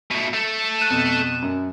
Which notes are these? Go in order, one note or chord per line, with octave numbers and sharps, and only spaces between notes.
B2 A3
A3
F#6 D#7 E7
F2 B2
F#2